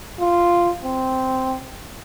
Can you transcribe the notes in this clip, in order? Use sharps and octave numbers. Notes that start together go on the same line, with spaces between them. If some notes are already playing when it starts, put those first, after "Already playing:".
F4
C4